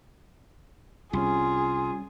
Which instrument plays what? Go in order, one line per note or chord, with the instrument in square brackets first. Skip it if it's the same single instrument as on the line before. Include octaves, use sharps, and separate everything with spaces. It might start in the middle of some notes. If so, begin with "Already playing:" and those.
[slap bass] C2 [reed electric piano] G3 C#4 [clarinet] F4 [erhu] G#4